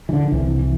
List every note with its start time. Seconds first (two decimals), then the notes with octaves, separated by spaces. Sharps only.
0.09 E3
0.13 D3
0.32 C2 C3 E3
0.59 E3